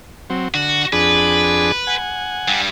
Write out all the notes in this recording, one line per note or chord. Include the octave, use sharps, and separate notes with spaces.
F#3 C4
D3 F#4
F2 D4 G#4 B4
F#5 G#5
G2 G3